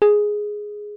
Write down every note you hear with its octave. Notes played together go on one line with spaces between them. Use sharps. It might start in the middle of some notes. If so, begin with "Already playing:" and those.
G#4